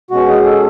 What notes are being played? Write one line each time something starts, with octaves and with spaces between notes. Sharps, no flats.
B2 G#3 C#4 F#4
G#4
A4